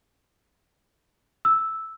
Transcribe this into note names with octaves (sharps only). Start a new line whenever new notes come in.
E6